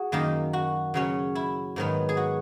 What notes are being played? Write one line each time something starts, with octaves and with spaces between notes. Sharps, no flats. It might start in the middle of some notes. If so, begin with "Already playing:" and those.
Already playing: F#4 G#4
F#2 D#3 A#3 D#4
F#4
C#3 F#3 C#4
E4
G#2 D#3 F#3 B3
G#4
F#4